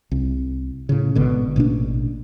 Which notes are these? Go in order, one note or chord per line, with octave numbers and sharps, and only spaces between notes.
C2
A2 C#3
G#1 B2 D3
A1 B2 A#3 D4